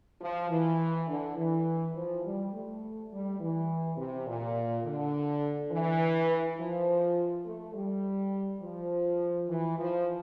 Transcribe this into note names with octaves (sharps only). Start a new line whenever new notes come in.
F3
E3
D3
E3
F3
G3
A3
G3
E3
C3
A#2
D3
E3
F3
A3
G3
F3
E3
F3